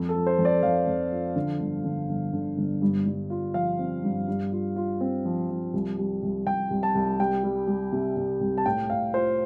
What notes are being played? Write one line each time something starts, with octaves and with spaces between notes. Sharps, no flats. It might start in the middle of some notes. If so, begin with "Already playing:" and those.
Already playing: F2
A4
F3
C5
F2
D5
F2 F5
F2
F3
D3
G1
D3
G1
D3
G1
G2
G2
F4
F3 F5
C4
G2
G2
F4
F4
C4
F3
F3
C2
G3
C2
C2 G5
C2
A5
C2
G3 G5
G3
G3
C3
C3
C2
A5
A2 G5
A2 F5
F4 C5